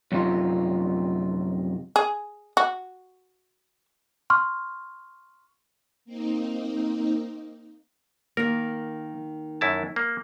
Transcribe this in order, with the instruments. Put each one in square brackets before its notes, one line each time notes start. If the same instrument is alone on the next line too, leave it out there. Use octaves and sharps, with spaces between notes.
[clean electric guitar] F#2 C3 F3 D#4 F4
[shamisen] G#4
F#4
[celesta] C6 C#6 F6
[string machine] A#3 C4 D#4
[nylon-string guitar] D#3 A#3 [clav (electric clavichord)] A#4
[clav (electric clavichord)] F#2 E4 A5
A#3